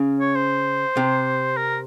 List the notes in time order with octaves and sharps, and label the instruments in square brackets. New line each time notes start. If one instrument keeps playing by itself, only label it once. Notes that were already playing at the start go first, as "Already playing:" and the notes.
Already playing: [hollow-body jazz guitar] C#3
[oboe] C#5
C5
[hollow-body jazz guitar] C3
[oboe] A#4